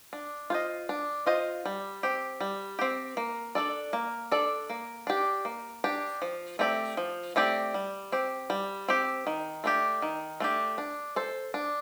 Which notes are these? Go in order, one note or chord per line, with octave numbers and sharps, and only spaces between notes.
D4
F4 C5 D#5
D4
F4 C5 D#5
G3
C4 G4
G3
C4 G4
A#3
D4 A4 D5
A#3
D4 A4 D5
A#3
D4 G4
A#3
D4 G4
F3
A3 C4 G4 D5
F3
A3 C4 G4 D5
G3
C4 G4
G3
C4 G4
D#3
A3 D4 G4
D#3
A3 D4 G4
D4
A4 C5
D4